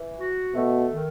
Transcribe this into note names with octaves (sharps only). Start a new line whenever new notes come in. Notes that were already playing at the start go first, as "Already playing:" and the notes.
Already playing: E3
F#4
B2 A3
D#3